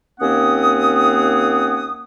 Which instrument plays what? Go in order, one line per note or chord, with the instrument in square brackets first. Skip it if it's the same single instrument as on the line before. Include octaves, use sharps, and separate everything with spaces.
[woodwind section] D#2 A#3 C4 C#4 F#5 D#6